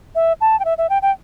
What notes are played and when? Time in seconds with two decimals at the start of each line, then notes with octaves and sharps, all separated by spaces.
0.15 E5
0.41 A5
0.60 G5
0.65 E5
0.78 E5
0.90 G5
1.02 G5